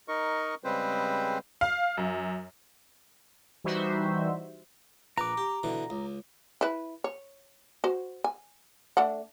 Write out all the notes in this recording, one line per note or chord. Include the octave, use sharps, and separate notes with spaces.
D#4 A#4 D#5 C#6
C#3 G3 G#3 C4 B4 C5
F5
F#2
E3 G3 D#4 F#4 C5 E5
A#1 B4 A#5 D6
G4
B2 D3 E3
C#2
E4 B4
C#5
F#4 C5
G#5
A3 D4 F#5